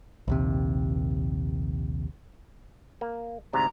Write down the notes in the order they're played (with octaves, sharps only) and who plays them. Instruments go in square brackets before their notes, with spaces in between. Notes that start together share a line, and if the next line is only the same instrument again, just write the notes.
[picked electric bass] A#1 D#2 C3
[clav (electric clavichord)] A#3
[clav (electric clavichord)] D2 G#2 C3 [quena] A#5